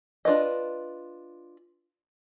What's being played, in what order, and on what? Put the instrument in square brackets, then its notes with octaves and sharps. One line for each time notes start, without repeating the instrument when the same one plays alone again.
[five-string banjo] D4 F4 B4 D#5